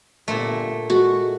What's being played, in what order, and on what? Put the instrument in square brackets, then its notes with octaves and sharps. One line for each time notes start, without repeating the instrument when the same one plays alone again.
[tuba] G1 [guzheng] A#2 A3
[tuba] G#3 [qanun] F#4